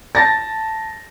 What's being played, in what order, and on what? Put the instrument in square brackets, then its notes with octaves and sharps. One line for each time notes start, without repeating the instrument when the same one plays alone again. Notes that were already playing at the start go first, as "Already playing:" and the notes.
[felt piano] A5 A6 A#6